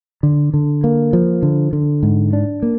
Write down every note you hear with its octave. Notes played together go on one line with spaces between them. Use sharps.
D3
D3
A#3
F3
D3
D3
G#2
D4
A#3